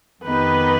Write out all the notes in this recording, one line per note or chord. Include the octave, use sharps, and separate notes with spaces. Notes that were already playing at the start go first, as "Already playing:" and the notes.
F2 D#3 B3 D#4 G4 B4